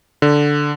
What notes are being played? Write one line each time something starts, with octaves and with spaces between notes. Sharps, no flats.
D3